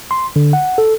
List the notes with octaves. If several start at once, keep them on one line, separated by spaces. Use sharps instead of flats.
C6
D3
F#5
A4